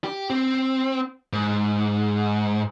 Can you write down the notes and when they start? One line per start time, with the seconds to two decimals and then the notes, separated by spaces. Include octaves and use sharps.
0.04 G4
0.30 C4
1.33 G#2